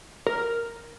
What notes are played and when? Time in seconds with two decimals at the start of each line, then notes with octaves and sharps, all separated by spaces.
0.27 A#4